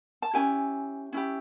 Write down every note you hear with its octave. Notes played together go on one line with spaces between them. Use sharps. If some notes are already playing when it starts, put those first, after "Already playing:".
A5
C#4 E4 G4 G#5
C#4 E4 G4